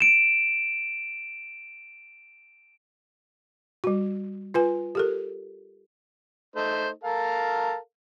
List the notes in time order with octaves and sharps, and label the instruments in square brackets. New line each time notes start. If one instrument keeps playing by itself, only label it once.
[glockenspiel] D7 E7
[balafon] G3 F#4
F4 B4 G#5
G4 A4 A#4
[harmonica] A3 D#4 C5
A4 A#4 F5